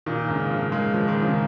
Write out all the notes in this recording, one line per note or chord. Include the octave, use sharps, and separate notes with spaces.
A#2 D#3
G#2 C#3
C#3 F3
D#3 G#3
F3
D#3
C#3 F3